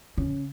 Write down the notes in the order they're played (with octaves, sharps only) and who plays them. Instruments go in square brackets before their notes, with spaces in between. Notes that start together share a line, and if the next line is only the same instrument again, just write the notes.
[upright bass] C#3